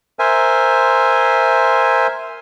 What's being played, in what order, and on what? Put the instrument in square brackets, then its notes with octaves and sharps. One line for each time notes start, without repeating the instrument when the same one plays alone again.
[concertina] A#4 C5 E5 G#5